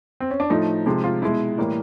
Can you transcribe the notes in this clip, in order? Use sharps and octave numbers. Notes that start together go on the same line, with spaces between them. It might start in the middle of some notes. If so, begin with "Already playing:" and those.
C4
C#4
D4
A2 F3 A3 D#4
C3 F3 G#3
F4
B2 G#3 E4
A2 E3 G3 A#3